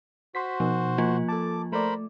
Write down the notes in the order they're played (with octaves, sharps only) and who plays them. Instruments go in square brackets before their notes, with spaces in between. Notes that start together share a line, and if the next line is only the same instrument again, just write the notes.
[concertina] F#4 C5 [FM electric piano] C6 B6
[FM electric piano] B2 D#4 [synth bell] F3
[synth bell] F3 A#3 F4
[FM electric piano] A4 A5 [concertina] D6
[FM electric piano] A3 D5 [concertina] A#4 C5 B5